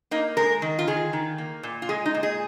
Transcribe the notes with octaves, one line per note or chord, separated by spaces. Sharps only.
A#3 D#4
G#3 A#4
D#3
F4
D#3 G#4
D#3
A#3
A#2
F4
G#3 G#4
D#4
A#2
G#4